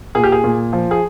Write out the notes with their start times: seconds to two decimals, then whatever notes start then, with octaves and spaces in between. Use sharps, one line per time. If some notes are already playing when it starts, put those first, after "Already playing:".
0.15 A#2 G#4
0.24 G4
0.32 G#4
0.44 A#2
0.73 F3
0.91 G#4